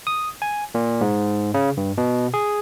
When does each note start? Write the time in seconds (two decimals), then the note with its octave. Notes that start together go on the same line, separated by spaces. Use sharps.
0.07 D#6
0.42 G#5
0.75 A#2
1.01 G#2
1.54 C#3
1.77 G2
1.98 B2
2.34 G#4